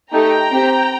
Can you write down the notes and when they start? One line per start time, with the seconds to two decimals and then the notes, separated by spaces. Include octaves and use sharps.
0.13 A3 D#4 G4 G5 A#5
0.52 C4 G4